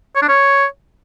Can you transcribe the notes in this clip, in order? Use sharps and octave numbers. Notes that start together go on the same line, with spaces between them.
C#5
D4
C#5